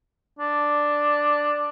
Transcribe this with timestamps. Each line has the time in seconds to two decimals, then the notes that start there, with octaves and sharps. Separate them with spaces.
0.39 D4